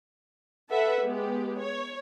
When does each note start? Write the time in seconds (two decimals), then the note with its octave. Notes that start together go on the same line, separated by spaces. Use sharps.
0.70 A4 B4 E5 F#5
1.04 G#3 B3 G4
1.58 C#5